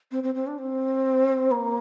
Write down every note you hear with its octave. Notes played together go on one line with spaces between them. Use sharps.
C4
C4
C4
D4
C4
A#3